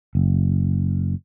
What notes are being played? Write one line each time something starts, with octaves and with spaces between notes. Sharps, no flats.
F#1